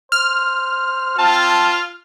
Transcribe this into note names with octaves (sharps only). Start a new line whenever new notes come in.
C5 F6
C4 F4 A5